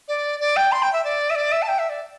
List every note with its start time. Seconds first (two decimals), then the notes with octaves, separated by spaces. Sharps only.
0.08 D5
0.40 D5
0.56 G5
0.72 C6
0.82 G5
0.93 E5
1.04 D5
1.30 E5
1.35 D5
1.52 E5
1.62 A5
1.68 G5
1.79 E5
1.89 D5